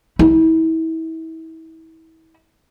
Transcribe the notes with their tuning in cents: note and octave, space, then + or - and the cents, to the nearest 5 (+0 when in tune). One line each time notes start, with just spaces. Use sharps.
E4 -35